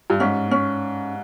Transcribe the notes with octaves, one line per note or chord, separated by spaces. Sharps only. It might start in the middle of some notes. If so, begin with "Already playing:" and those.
G2
G#2 C#4
C#4